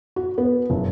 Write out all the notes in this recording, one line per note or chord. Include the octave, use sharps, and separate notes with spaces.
F#4
B3
F#1